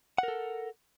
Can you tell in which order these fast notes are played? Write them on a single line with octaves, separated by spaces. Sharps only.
F#5 A#4 A4